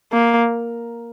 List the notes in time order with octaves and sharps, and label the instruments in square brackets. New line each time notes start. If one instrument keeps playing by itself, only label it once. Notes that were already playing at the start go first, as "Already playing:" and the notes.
[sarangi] A#3